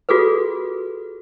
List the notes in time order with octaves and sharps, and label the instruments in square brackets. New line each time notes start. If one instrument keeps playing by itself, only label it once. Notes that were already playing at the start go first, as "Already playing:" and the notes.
[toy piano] F4 F#4 G#4 A4 B4